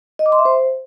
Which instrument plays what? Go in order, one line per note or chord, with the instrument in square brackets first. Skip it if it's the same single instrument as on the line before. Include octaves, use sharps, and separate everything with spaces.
[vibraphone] D#5
D6
C6
E5
C5